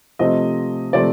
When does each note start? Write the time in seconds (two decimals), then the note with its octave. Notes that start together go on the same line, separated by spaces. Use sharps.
0.19 C3 F3 A3 C4 D#5
0.93 C3 F3 A3 C4 D5